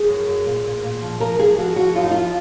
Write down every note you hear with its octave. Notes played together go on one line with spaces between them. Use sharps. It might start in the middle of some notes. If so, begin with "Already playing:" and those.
Already playing: G#4
F#2
F#2
A#2
A#2
A#2
F3
F3 A#4
F3 G#4
F3 F#4
F3 F#4
F#2 F4
D#4
F3 F4